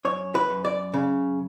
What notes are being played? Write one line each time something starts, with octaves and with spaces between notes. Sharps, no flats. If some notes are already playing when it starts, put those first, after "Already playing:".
F#2 C#5
B4
F#2
D5
C#3